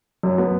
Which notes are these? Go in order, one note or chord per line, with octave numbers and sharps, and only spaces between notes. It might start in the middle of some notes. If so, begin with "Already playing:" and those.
F#2
B3